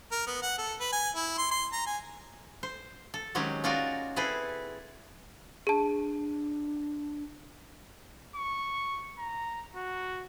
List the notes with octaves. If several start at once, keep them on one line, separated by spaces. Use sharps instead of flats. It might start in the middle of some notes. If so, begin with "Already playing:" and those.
A#4
B3
F#5
A4
B4
G#5
E4
C6
C6
A#5
G#5
C5
A4
D#3 F#3 G#3 C4 C#4 G4
C#4 D#4 F4 F#4 A#4 D5
C4 E4 G#4 A4 B4
D4 G#4 A5
C#6
A#5
F#4